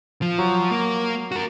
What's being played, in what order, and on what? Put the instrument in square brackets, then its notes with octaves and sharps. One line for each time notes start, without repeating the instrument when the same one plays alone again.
[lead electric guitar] F3
[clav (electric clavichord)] F#3
[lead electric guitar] A#3
F#4 A#4